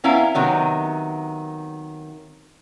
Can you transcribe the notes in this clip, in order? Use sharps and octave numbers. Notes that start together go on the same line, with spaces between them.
B3 C#4 E4 F5 A#5
C3 D#3 F#3 B3